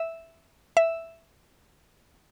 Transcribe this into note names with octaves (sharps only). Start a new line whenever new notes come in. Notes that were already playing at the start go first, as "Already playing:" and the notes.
Already playing: E5
E5